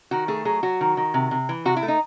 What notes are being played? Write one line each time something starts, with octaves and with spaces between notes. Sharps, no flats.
D#3 F#4
A3 G#4
F#3 G#4
F#3 F#4
D#3
D#3
C3
C3
E3
C3 F#4
E4
A3
D#4